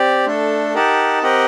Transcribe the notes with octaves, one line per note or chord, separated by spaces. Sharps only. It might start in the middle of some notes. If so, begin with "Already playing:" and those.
Already playing: C4 G4 D5
A3 D4 A4
D#4 G4 A#4 F#5 A5
C4 G4 A#4 D#5 F#5